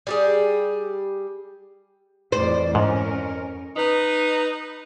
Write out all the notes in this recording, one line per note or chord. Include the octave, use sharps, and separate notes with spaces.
G3 G4 G#4
F2 A2 E3 C5 D5
F2 G#2 C#4 A#4
D#4 B4